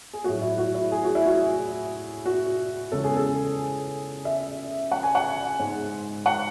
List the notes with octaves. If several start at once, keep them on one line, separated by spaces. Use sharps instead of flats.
G#4
A2 F#3 A3 F#4
E4
F#4
E4
G#4
F#4
E4
F#4
F#4
E2 C#3 G#3 A4
G#4
A4
E5
F#5
G#5
F#5
G#2 G#3
F#5